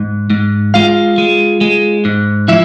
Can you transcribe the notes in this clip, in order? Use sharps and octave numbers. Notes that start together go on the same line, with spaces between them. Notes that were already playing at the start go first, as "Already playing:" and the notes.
Already playing: G#2
G#2
G#3 F4 F5
G#3
G#3
G#2
F3 E4 E5